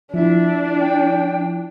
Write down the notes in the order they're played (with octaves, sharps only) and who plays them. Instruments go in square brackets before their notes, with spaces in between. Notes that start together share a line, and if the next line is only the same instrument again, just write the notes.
[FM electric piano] F3 E4 [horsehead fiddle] D4 [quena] E5
[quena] G5